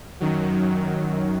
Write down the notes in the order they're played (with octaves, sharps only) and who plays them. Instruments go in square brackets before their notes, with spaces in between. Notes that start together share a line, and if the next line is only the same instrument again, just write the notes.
[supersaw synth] F#2 D#3 F#3